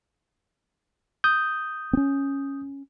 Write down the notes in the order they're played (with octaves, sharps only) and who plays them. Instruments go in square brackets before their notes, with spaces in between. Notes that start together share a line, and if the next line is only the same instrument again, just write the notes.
[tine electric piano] D#6 G6
[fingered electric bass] C4 C#4